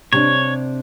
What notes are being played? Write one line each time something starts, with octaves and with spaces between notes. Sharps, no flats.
C3 D4 C#5